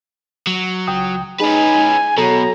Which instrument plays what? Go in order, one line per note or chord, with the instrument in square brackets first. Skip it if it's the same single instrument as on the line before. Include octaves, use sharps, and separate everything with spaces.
[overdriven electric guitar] F#3
[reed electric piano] C#2 G5 D#6
[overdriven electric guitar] C#4 B4 [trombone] D#4 [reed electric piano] G#4 [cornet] G#5
[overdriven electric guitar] B2 [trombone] F#3 [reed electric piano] A4 [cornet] A#5